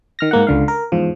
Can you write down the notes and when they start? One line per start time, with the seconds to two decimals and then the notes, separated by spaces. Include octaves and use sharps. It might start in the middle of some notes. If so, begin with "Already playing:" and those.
0.19 D#3 F6 A#6
0.31 G#2 A#3 F#5
0.47 C#2 D3 F5
0.68 A#4
0.92 E2 G#2 F3